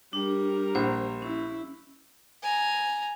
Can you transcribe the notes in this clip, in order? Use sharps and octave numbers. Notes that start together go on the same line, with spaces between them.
G3 D4 A#4
A#1 C5
C#4 E4
G#5 A#5